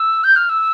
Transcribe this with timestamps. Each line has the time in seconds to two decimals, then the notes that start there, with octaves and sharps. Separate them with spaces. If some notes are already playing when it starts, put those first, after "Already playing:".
Already playing: E6
0.24 G6
0.36 F6
0.49 E6